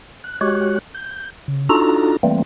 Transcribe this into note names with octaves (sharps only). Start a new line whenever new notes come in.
F#6
G#3 F#4 G4 C#5 F#6
G6
C#3
D4 D#4 F4 F#4 A4 A#5
E3 G3 A3 A#3 C4